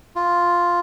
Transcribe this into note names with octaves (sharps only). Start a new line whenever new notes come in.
F4